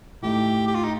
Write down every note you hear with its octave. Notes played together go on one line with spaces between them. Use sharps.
A2 A3 D#4 G4
G4
F4
D#4